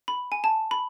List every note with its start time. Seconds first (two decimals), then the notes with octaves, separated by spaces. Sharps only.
0.08 B5
0.32 G#5
0.44 A5
0.71 B5